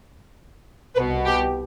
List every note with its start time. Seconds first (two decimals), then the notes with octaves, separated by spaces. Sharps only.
0.97 C2 B2 B4
1.26 G4